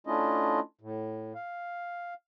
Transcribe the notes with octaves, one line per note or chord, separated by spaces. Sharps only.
A3 C#4 D4 E4 F4 D#5
A2
F5